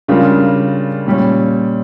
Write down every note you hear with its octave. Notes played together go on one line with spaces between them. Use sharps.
C#3 G3 D4 F4 A#4
A#2 G3 C#4